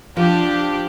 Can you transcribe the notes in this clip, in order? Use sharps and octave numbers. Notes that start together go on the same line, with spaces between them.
F3 D4 G4